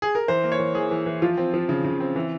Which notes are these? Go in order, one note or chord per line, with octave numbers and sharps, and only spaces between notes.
G#4
A#4
E3 C5
A#3
C#5
E3
E3 G#4
E3
E3
F3 F4
C4
F3
C#3
C#3
C4
E3